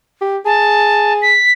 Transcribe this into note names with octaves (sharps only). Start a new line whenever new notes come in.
G4
G#4 A5
B6